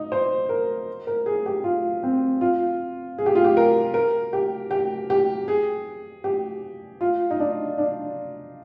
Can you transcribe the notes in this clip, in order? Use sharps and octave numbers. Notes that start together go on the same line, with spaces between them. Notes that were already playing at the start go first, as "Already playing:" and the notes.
Already playing: D#4
C5
A#4
A#4
G#4
G4
F4
C4
F4
G#4
G4
F4
G4
A#4
A#4
G4
G4
G4
G#4
G4
F4
D#4
D4
D4